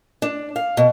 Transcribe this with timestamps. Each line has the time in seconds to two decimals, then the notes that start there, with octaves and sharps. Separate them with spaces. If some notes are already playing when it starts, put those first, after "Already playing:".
0.22 D4
0.56 F5
0.77 B2